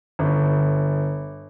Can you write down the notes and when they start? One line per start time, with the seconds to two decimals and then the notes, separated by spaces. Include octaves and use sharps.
0.19 G1